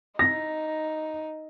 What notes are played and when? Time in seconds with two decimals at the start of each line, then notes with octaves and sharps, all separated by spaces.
0.19 D#4 A#6